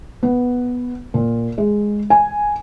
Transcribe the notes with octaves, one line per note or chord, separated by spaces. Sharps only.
B3
A#2
G#3
G#5